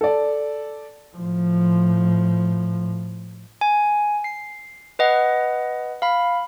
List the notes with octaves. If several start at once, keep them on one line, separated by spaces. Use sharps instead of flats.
A4 D5
A2 F3
G#5
C7
B4 D#5 F#5
F5 B5